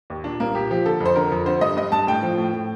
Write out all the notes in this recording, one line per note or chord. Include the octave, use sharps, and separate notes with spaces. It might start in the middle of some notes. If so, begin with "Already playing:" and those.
D#2
A#2 D4
C2 A#3
A#2 G4
F3 G4
D3 A4
F2 C5
D3 A#4
F2
D3 C5
G2 D#5
G2 D#5
G2 A5
A2 G5
F3
A2
A2